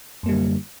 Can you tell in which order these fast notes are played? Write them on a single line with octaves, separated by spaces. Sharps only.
F#2 A#3 G3 D3